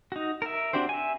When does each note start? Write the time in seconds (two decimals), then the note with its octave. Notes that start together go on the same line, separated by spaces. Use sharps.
0.12 D#4 F#4
0.42 A#4 E5
0.73 C4 D4 F#4 G4 C5
0.89 E5 G#5